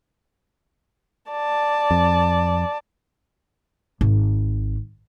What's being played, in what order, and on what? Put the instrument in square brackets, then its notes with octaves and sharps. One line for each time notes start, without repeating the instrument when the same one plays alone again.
[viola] D5 A5
[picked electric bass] F2
[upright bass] G#1